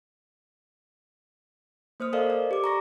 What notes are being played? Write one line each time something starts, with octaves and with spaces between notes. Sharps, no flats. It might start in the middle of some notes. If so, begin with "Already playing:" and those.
A#3 C5 D#6 F6
A4 A#4 C5 D5 D#5 F5
D5
G4 D6
A#5 C#6 A#6